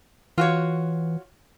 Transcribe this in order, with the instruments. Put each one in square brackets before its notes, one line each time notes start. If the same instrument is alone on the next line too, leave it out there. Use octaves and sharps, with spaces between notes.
[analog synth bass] E3 [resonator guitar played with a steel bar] F4 F#4 C#5